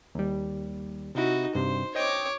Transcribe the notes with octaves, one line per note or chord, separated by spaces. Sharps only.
D#2 G3
C3 D#4 E4 F#4
G2 C3 C5
C5 C#5 D#5 G5 D6